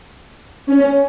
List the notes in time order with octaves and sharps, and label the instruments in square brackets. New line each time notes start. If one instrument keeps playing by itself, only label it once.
[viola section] C#4